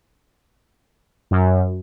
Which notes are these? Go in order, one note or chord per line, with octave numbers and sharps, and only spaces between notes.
F#2